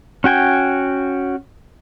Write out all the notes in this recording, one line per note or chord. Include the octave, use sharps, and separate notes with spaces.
C#4 F#4 G5 G#5